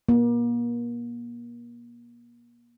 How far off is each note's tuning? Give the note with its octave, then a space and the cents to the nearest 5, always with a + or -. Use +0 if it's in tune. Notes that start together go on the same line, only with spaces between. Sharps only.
A#3 +35